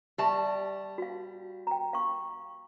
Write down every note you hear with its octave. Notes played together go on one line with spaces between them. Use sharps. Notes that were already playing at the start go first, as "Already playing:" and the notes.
G3 G4 E5 A5 C#6
F#4 F5
G5 A#5
F5 C#6